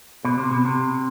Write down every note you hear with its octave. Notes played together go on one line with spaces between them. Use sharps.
B2
C3
B2
C3